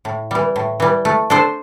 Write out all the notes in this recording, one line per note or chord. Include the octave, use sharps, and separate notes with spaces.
A2
E3 G3
A2
E3 G3
A3
D4 A4 C5